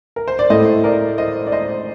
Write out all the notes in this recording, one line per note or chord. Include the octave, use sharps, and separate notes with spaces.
A#4
C5
D5
A2 A3 C5 D#5
A#4 D5
C5 D#5
D5
C5 D#5